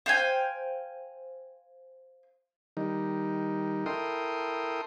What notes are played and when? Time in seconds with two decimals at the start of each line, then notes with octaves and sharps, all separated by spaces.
0.06 C5 F5 G5 G#5
2.77 D#3 G3 D#4
3.86 E4 A4 A#4 G5 C6 D#6